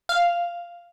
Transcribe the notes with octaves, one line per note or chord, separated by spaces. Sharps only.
F5